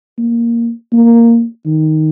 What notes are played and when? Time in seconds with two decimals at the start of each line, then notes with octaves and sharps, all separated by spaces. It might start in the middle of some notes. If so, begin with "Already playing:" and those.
0.18 A#3
0.93 A#3
1.66 D#3